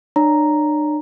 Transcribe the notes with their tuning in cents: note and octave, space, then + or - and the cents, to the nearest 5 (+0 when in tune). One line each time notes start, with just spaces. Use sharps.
D4 +40 C#5 +30 A#5 +0